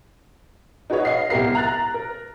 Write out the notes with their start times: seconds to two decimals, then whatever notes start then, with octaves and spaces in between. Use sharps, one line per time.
0.90 D#4 F#4 G#4 B4 C#5 D#5
1.05 D#5 F5 C7
1.30 C2 B3 G4 A#4 C7
1.55 A#5 F#6 A6
1.94 A#4